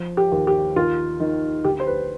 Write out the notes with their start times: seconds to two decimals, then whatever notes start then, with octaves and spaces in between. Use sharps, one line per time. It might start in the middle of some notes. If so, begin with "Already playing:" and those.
Already playing: F3
0.17 G4
0.32 D#2
0.47 G4
0.76 D#2 F4
1.20 D#3
1.65 D2 G4
1.80 C5
1.87 B4